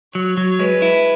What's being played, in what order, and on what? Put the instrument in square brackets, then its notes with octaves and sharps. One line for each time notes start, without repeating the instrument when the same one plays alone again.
[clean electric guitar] F#3 [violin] C#5
[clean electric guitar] F#3
[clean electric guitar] G#3 [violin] B4
[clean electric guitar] E4